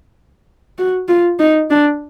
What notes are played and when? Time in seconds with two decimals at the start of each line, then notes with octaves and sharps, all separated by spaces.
0.78 F#4
1.08 F4
1.39 D#4
1.70 D4